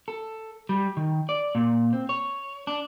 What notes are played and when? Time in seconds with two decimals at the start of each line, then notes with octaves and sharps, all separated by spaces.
0.08 A4
0.69 G3
0.97 D#3
1.29 D5
1.55 A#2
1.93 C4
2.09 C#5
2.67 D4